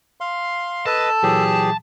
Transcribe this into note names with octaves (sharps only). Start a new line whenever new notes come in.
F5 C6
A4 B4 D#5 A5
A#2 E3 F#3 G4 G#4